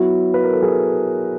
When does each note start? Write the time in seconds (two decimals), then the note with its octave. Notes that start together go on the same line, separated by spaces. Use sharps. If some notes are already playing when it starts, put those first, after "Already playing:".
Already playing: F#3 B3 E4 F#4
0.34 B4
0.44 A#4
0.53 A4
0.62 G#4 A#4